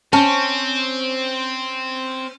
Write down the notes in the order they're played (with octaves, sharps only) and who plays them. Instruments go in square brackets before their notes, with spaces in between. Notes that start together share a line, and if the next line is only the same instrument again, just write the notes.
[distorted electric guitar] C4 [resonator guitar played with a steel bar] C#4 [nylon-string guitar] A5